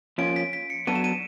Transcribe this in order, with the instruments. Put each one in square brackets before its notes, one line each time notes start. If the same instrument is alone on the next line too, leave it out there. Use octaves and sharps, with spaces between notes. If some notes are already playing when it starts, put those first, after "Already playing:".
[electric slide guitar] F3 A#3 C#4 F4 [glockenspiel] D7
[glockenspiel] B6
B6
C#7
[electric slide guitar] F#3 B3 D4 F#4 A4 [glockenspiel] D#7
[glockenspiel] E7
D#7